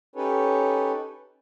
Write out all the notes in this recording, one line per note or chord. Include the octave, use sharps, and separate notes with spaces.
C#4 D#4 G4 A4 B4 C#5